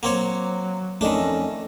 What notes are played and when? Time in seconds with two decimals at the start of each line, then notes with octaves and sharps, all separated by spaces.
0.03 F#3 A#3 C4 C#5
1.01 F2 D#3 A3 C#4 D4 A4 D#5